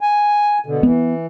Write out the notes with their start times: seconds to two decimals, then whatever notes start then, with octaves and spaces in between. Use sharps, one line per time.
0.01 G#5
0.66 B2 D3
0.83 E3 B3